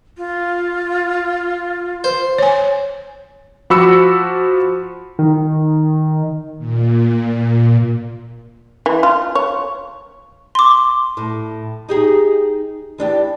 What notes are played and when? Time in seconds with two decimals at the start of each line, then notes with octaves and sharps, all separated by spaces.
0.18 F4
2.04 C5
2.38 C#5 G#5
3.70 F3 F#4 B5 D6 E6 C#7
5.19 D#3
6.58 A#2
8.86 E3
9.03 F4
9.35 C#5
10.55 C6 D6
11.17 A2
11.89 D#4 G4 G#4
12.98 E3 D4 G4